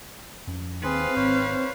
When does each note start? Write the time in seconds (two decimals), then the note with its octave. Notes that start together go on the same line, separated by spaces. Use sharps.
0.47 F2 F3 C#4
0.84 D#2 C4 G#4 B4 F5 C6
1.16 G#1 C5 C#5